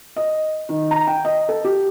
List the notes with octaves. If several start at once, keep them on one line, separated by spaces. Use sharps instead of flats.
D#5
D#3
A#5
G5
D#5
A4
G4